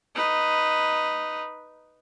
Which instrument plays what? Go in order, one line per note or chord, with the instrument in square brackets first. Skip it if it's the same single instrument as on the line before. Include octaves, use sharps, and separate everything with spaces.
[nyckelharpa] D#4 B4